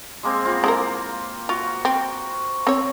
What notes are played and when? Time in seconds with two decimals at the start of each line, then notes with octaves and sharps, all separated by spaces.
0.23 G#3 A#3 C4
0.44 B3 C4 F4
0.64 G#3 A#3 E4 A#4
1.49 F4 F#4
1.85 C4
2.67 C4 C#5